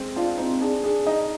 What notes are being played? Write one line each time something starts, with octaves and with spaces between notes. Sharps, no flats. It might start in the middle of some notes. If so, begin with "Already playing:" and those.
Already playing: G#3 C4
D4 F4
C4 D#4
D4 G#4
D4 G#4
D#4 D#5